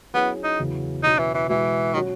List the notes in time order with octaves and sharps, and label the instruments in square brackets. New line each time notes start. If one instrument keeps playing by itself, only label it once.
[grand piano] F#3 C#4 E4 G#4 [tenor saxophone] B3
[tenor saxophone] D#4
[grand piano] E2 C#3 F#3 C#4 E4
[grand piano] B2 F#3 C#4 F#4 [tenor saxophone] D#4
[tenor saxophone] E3
E3
[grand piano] B2 G#3 B3 F#4 [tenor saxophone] E3
[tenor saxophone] D#3 [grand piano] F#3 C#4 F#4